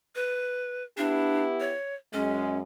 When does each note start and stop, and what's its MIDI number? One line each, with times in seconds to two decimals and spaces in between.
0.15 0.83 71
0.97 1.73 59
0.97 1.44 62
0.97 1.73 64
0.97 1.73 67
1.60 1.94 73
2.13 2.61 42
2.13 2.61 56
2.13 2.58 61